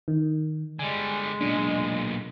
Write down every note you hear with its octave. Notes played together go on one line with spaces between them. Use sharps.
D#3
D3 G3 G#3 G#5
B1 A#2 D4